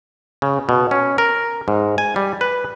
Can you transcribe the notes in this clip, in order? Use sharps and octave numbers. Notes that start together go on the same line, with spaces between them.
C#3
B2
C#4
A#4
G#2
G#5
G3
B4